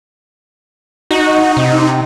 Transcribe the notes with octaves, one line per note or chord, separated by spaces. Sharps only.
D#4 F#4
C3